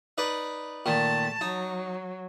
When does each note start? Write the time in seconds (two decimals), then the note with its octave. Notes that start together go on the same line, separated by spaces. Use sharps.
0.18 D#4 B4 D5
0.86 A#2 D#3 A3 A5
1.41 F#3 D#4